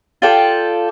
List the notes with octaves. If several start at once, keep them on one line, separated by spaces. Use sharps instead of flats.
F4 A4 D5 G5